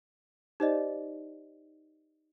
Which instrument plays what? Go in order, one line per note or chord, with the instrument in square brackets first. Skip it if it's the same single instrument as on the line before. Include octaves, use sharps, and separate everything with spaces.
[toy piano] D#4 D#5 [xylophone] G4 C5 D5